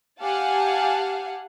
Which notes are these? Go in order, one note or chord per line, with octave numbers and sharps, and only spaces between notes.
G4 F5 F#5 G#5 A5